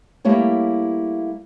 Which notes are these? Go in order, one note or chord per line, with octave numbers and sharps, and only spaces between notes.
G3 A3 A#3 E4 C#5